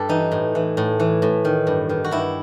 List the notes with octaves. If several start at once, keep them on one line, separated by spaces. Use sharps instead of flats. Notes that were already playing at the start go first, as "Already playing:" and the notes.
Already playing: G2 G4 A4
E3 D#4
A2
E3
A2
E3
A2
D#3
G2
D#3
F#4
G2 E4